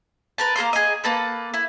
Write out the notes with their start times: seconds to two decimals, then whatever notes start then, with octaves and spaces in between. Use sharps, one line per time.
0.38 A#4 B4 A5
0.56 A#3 G#4 A#5 C6
0.73 G#4 D#5
1.04 A#3 A4 B4
1.54 E4